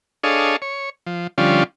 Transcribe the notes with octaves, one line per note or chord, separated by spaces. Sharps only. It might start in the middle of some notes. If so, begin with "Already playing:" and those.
D4 G#4 A4 C#5 D#5 F5
C#5
F3
D3 F3 G3 C#4 F4